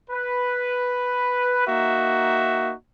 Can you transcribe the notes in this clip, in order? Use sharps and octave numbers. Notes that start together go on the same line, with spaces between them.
B4
A#3 D#4 F#4 E5